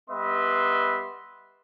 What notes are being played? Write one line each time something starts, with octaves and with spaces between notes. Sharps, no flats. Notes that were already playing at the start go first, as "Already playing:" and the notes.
G3 B3 B4 D#5 E5 C6